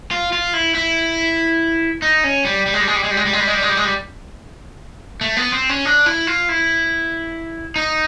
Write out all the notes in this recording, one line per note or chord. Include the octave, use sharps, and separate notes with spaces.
F4
F4
E4
E4
D#4
C#4
G3
G3
G#3
G3
G#3
G3
G#3
G3
G#3
G3
G#3
G3
G#3
G3
G#3
G3
G#3
G3
A3
B3
C4
C#4
D4
E4
F4
E4
D#4